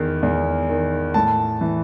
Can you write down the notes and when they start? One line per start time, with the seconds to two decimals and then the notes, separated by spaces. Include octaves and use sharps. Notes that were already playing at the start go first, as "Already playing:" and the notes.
Already playing: E2 D#3
0.23 E2
0.69 D#3
1.14 A2 A5
1.61 E3